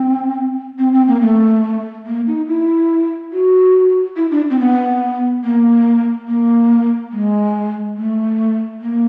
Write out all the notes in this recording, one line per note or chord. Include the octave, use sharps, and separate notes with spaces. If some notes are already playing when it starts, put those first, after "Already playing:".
Already playing: C4
C4
C4
A#3
A3
A#3
D#4
E4
F#4
E4
D4
C4
B3
A#3
A#3
G#3
A3
A#3